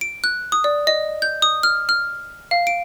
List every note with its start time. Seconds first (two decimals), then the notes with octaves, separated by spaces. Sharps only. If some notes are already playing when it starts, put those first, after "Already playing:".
0.01 D7
0.24 F#6
0.52 D#6
0.64 D5
0.87 D#5
1.22 G6
1.42 D#6
1.63 F6
1.89 F6
2.51 F5
2.67 D7